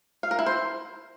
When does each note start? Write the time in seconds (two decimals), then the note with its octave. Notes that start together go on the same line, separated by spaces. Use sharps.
0.23 F5
0.31 A#4
0.39 E4
0.46 C5